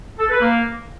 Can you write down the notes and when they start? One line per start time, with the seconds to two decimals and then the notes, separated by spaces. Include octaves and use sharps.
0.19 A4
0.30 B4
0.41 A#3